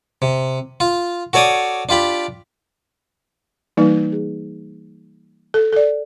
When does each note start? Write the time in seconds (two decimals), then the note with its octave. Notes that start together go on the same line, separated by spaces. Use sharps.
0.22 C3
0.80 F4
1.33 F#4 A4 C#5 D5 D#6
1.89 D4 F4 G4 B5
3.77 E3 G3 A#3 D#4 B4
4.12 G#4
5.54 A4
5.73 A4 D5